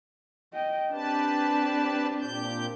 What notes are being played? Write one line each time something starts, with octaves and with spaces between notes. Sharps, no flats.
D#5 G5
C4 D4 G4 B4 A5
A#2 G4 G6